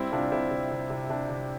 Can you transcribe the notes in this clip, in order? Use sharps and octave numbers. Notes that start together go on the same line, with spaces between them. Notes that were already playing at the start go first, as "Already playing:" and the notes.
Already playing: G3 C4 E4
C3 D4 F4
C3 C4 E4
C3
C3
C3
C3 D4
C3